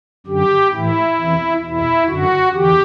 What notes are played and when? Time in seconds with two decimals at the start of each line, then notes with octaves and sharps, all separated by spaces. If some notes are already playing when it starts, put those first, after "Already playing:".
0.26 F#2 D3 G4
0.72 A2 E3 E4
1.17 E2 C3 E3
1.63 E2 B2 E4
2.08 F#2 D3 F#4
2.53 E2 D3 G4